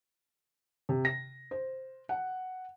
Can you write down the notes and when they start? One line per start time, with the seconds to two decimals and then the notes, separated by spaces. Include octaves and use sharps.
0.89 C3
1.05 A#6
1.51 C5
2.09 F#5